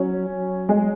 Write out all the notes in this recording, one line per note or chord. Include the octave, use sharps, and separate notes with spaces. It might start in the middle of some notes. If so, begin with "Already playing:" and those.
Already playing: F#3 C#4
F#3
G#3